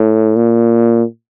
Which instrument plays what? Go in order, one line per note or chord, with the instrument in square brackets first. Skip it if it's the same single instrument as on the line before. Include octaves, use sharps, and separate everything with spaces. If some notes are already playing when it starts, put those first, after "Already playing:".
Already playing: [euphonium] A2
A#2